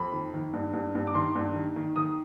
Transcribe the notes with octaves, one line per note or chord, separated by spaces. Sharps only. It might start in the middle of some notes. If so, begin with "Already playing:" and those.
Already playing: F2 B5
D#3
D#3
G2
G2
G2
D6
D#3 C6
G2
D#3
D#3
D#3 D#6